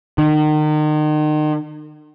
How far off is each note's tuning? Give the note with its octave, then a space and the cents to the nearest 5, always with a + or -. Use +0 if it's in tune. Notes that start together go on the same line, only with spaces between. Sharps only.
D#3 -35